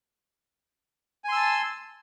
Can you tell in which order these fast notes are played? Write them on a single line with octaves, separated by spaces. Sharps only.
G#5 C6 E6 A5